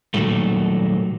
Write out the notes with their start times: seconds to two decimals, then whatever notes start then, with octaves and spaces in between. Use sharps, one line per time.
0.14 A#2 D#3 F#3 G3 A3